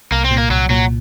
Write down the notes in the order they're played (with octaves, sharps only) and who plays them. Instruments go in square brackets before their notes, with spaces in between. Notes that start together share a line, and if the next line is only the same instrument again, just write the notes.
[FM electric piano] C2 [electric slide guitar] A#3
[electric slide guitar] C4
[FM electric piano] A#2
[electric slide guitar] A#3
[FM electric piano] C2 [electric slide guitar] F#3
[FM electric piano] A#2 [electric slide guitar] F#3